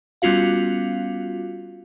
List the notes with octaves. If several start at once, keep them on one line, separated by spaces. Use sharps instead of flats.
G3 B3 C#4 F4 F#4 F5